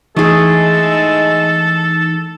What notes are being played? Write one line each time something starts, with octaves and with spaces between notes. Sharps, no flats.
E3 G#3 A3 D#4 G#4 A4 A5